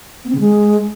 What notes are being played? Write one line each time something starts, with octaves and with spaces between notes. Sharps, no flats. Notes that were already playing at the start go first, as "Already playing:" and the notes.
B3
C4
C#3
G#3